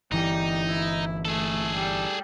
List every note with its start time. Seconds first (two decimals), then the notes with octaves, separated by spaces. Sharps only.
0.12 G1 E3 G3 D#4
0.67 E4
1.25 A3 G#4 A4
1.75 G3